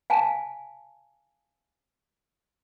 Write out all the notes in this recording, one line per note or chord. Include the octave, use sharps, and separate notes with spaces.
F5 G#5 A5